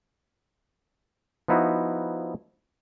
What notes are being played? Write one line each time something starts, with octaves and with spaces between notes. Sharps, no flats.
F3 B3 D#4 E4 F#4